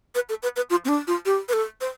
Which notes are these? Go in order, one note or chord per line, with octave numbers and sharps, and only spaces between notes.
B4
A4
B4
B4
F4
C4
D4
F4
G4
B4
A4
C5